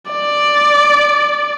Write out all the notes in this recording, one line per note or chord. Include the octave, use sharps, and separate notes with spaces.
D5